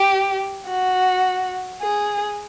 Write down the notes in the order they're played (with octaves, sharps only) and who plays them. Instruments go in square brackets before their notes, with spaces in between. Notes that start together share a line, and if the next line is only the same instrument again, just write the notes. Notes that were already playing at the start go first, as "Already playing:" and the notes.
Already playing: [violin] G4
F#4
G#4